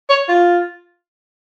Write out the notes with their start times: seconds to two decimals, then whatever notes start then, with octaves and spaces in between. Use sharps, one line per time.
0.09 C#5
0.28 F4